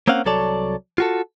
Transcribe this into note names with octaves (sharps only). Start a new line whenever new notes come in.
A#3 C4 C#4 F5 F#5
C2 F#3 A4 C#5 D5 A5
F4 F#4 A4